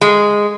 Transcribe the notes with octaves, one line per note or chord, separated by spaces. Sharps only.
G#3